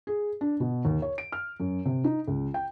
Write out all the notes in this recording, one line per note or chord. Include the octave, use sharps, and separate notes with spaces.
G#4
D4
B2
D#2
C#5
D7
F6
F#2
C3
D#4
C#2
G5